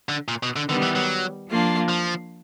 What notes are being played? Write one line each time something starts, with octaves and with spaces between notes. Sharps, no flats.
D3
A#2
B2
D3
D3 D#3 G3 B3
E3
F#3
F3 A#3 D4 F4
F3